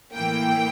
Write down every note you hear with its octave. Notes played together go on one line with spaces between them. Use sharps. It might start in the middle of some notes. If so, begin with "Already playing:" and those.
A2 E3 A#3 G5